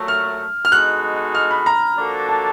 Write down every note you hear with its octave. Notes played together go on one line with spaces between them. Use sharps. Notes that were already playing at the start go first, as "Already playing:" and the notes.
Already playing: A#2 F#3 A3
F6
F6
G#3 B3 D#4 F#4 A4 F#6
F6
B5
A#5
F3 A#3 D4 F#4 A4
A5